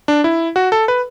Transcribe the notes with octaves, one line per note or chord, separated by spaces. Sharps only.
D4
E4
F#4
A4
B4